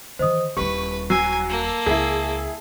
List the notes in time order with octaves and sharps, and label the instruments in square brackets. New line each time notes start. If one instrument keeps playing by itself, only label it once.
[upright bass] D#3 E3 [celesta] C5 D#5 D#6
[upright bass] D#1 E4 [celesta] G4 [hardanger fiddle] B4 [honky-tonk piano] C#6
[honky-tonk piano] F#3 [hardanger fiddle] G#5 [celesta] E6 C7
[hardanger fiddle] A#3 A4
[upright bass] C#2 [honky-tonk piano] E4 G#4